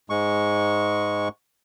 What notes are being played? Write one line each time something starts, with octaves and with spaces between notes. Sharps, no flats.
G#2 G#3 C#6